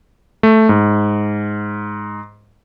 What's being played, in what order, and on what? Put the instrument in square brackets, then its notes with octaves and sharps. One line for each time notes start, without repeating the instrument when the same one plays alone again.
[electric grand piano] A3
G#2